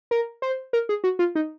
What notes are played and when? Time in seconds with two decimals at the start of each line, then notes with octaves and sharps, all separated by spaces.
0.11 A#4
0.42 C5
0.73 A#4
0.89 G#4
1.04 F#4
1.19 F4
1.35 D#4